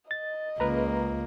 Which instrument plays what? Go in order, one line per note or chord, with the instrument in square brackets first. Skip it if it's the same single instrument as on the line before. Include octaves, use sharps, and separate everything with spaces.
[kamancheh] D#5 [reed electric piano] A6
[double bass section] C#2 [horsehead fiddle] A#3 [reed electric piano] B4 A#5